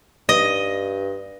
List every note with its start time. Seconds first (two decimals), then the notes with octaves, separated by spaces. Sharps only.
0.29 G2 D#5